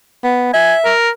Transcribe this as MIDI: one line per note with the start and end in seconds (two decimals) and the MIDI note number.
0.24 0.52 59
0.54 0.92 76
0.54 0.74 80
0.85 1.10 70